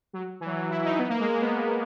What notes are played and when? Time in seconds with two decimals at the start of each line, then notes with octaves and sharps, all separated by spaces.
0.13 F#3
0.40 E3
0.46 F#3
0.56 F#3
0.70 E4
0.85 D#4
0.98 B3
1.09 A#3
1.20 G#3
1.31 A#3
1.41 B3